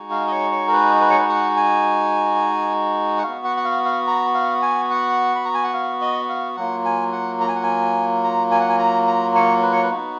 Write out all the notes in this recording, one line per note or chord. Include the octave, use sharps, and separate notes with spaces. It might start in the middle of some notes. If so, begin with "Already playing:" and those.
Already playing: G#3 D#4 F#4
F5
D#5
C#5
C#5
A#4
B4
B4
C#5
B4
F#5
G#5
F#5
B3 F#4 F5
F#5
F#5
F5
F5
A#5
F5
G#5
F#5
B5
A#5
G#5
F#5
F5
D#5
F5
F#3 A#3 F4 F#5
G#5
F#5
A#5
G#5
F#5
G#5
A#5
G#5
F#5
G#5
A#5
A#5
C#5
B4
C#5
B4
B3 D#4 F#4